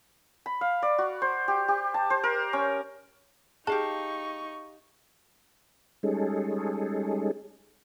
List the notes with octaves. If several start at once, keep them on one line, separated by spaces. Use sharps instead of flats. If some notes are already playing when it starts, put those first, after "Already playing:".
B5
F5
D5
F#4
C5
G4
G4
A5
C5
A#4
C#4
D#4 G4 G#4 F5 A5 C#6
G3 G#3 C#4 D#4 G#4 A4